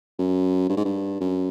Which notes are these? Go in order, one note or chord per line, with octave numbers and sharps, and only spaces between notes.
F#2
G2
G#2
G2
F#2